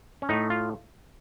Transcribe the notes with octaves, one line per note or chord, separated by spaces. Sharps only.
C#4
A2 A3 D#4
F4